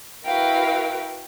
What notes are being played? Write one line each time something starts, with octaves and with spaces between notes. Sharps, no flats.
E4 F#4 A#4 B4 F5 G5